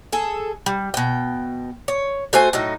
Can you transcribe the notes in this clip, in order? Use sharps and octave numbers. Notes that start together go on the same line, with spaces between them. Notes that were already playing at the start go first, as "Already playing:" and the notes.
G#4 A4
G3
B2 G5
C#5
A3 F#4 C5 G#5
A2 F#3 D#4